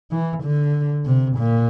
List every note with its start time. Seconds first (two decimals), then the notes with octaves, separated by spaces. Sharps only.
0.11 E3
0.43 D3
1.06 C3
1.37 A#2